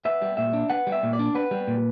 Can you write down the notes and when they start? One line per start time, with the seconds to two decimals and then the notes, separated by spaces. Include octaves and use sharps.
0.05 B3 E5
0.22 G3
0.37 A#2 E5
0.53 D4
0.70 B3 F#5
0.87 G3
0.92 E5
1.03 A#2
1.13 D5
1.19 D4
1.35 B3 B4
1.51 G3
1.67 A#2